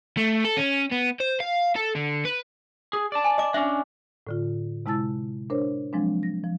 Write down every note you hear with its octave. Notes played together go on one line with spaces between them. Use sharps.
A3
A4
C#4
B3
C5
F5
A4
D3
B4
G#4
D5 A5
G#5
D#5 D6
C#4 D4 E5
A2 D3 F4
C3 G#3 E4 A5 E6 A6
D4 A#4 C5 C#5
F3 F#3 G#3 C4 D4
A#6
F3